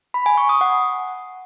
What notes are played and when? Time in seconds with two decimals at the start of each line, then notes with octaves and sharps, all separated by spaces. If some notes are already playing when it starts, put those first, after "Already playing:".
0.14 B5
0.26 G#5
0.38 C#6
0.49 D#6
0.61 F#5